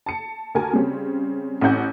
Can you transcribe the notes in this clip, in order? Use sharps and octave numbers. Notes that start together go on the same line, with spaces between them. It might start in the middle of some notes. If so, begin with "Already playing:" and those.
A5 C#7
D2 A#4 G#5 A5
C#3 G3 C4 C#4
A1 C4 C#4 F#5 G6